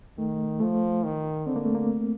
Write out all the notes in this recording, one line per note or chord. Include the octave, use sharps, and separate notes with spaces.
D#3 A3
F3 A3
D#3
D3 C4
A#3
A3
A#3